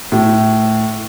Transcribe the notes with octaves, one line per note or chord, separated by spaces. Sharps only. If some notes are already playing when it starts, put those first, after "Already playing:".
A2